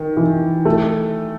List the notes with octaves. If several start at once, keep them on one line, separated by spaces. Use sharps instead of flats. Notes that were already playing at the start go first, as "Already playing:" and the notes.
Already playing: D#3
E3
A3